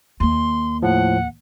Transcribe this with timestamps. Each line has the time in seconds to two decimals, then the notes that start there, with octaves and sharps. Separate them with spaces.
0.20 D#2 A#3 C6
0.82 A2 F3 F#5